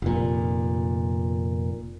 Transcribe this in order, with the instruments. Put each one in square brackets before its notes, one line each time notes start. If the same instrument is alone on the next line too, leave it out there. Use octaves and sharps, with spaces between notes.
[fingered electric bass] F1 A#2